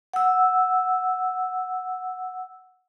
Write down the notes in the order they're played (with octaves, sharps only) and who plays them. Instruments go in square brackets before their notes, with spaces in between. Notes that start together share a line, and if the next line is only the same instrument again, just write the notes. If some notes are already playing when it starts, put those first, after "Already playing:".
[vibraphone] F#5 E6